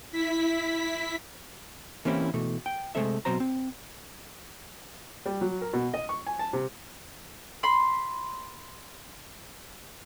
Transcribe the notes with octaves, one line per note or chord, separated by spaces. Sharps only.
E4 B6
E3 A#3 C4 C#4 E4 G4
B2 E3 A3
G5
C3 G#3 A3 C4 A4 E5
B2 F#3 C4 C5 A#5
C4
G3
F#3
A#4
B2
D#5
C#6
G#5
A5
C3
B5 C6